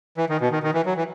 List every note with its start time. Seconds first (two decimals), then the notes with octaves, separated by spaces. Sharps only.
0.17 E3
0.29 D#3
0.41 B2
0.52 D#3
0.63 D#3
0.74 E3
0.86 F#3
0.97 E3